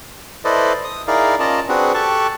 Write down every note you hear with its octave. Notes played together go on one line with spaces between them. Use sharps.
E4 A4 B4 C5 D5 D#5
D#6
D#4 E4 G#4 A#4 D5 F5
C#4 F4 A#4 D5 D#5 A5
C4 D4 F#4 G#4 B4
G4 A4 A5 C#6 F#6